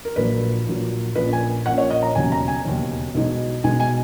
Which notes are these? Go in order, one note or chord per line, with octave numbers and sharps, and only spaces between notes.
A#4
A#1 A#2 F#3 B4
A#1 A#2 F#3
A#1 A#2 A#3 C#4 B4
G#5
A#1 A#2 A#3 C#4 F#5
C#5
D#5
A#5
E1 D#2 C#3 F#3 C#4 G#5
A#5
G#5
E1 D#2 C#3 F#3 C#4
B1 B2 G#3 D#4
B1 B2 G#3 D#4 G#5
G#5